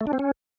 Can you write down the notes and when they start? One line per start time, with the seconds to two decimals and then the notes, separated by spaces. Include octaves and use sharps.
0.01 A3
0.07 D4
0.13 C4
0.19 C#4